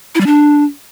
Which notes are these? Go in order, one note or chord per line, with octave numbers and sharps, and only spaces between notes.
E4
G3
D4